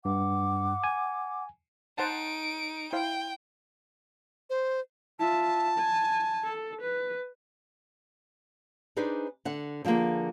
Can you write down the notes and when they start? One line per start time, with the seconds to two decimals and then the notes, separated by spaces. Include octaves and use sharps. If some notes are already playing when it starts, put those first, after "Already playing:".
0.05 G2 F#5 D6
0.84 G#5
1.98 D#4 C5 F#5 A5 D7
2.93 E4 C5 F5 G5
4.50 C5
5.19 F4 E5 A5
5.78 G#5
6.45 A4
6.82 B4
8.97 D4 D#4 G#4 B4 C5 D5
9.45 D3 F#5
9.85 D3 F3 G#3 A#3 G#4